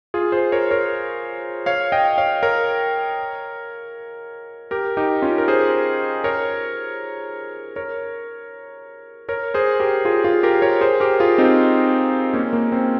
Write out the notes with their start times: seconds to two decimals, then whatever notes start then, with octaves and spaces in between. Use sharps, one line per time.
0.14 F4 G#4
0.32 G#4 C5
0.52 A#4 C#5
0.71 A#4 C#5
1.66 C#5 F5
1.92 D#5 G5
2.17 C#5 F5
2.43 A#4 C#5
4.71 G4 A#4
4.97 D#4 G4
5.22 C#4 F4
5.38 A#4
5.48 G#4 C5
6.24 A#4 C#5
7.76 A#4 C#5
9.29 A#4 C#5
9.54 G#4 C5
9.80 G4 A#4
10.05 F4 G#4
10.24 F4 G#4
10.43 G4 A#4
10.62 A#4 C#5
10.81 G#4 C5
11.00 G4 A#4
11.20 F4 G#4
11.38 C4 D#4
12.34 A#3 C#4
12.53 A#3
12.72 C4